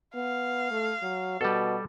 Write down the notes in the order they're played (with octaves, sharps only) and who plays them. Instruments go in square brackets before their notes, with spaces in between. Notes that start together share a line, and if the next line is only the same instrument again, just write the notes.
[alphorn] B3 [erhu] F5
[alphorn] A3
F#3
[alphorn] B2 [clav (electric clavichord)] G3 A4